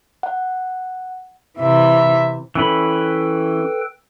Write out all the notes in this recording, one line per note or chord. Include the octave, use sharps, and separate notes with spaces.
F#5
C3 E3 E5
E3 C#4 A4 B4 G5 B5